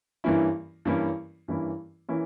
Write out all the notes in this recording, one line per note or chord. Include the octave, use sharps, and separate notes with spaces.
G2 E3 A#3 C#4 E4
G2 E3 A#3 C#4 E4
G2 E3 A#3 C#4 E4
E3 A#3 C#4 E4